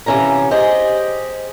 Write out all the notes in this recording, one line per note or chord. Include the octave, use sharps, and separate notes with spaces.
C3 E3 C#4 F4 A#5
G4 G#4 C5 D#5